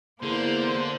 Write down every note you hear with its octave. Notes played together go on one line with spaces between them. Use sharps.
E2 D3 A#3 C5